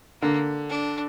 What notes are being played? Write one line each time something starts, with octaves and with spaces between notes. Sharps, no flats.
D3 A#3
D4